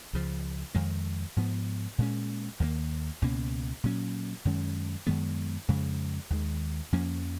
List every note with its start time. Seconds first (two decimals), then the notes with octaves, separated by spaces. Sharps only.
0.13 C#2 C#3 F3
0.75 F2 D#3 G#3
1.36 G#2 F3 B3
1.98 A#2 G#3 C#4
2.60 D#2 D#3 F#3 A#3
3.22 C#2 B2 A#3 C#4
3.84 A#2 F#3 C#4
4.45 F#2 D#3 G#3 C#4
5.07 F#2 D#3 G#3 B3
5.68 F2 C#3 G#3
6.30 D#2 D#3 G#3
6.93 F2 F3 A#3 C#4